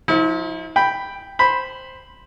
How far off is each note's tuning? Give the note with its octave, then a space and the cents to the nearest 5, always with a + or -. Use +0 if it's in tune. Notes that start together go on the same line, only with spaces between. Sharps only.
F3 +20 E4 -40
G5 +0 B5 +0
C5 +0 B5 -5